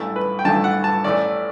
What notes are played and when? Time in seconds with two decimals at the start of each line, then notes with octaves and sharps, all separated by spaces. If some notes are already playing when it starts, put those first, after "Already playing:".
Already playing: A1 G2 E3 A3 E4
0.16 B4
0.39 G5
0.44 A1 G2 E3 A3 A5
0.64 F#5
0.84 A5
1.04 A1 A2 E3 A3 D5